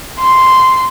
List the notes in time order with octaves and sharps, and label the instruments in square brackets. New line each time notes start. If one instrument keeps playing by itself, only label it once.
[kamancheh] C6